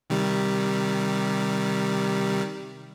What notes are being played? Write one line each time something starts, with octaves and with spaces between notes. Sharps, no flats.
C3 D#3 G3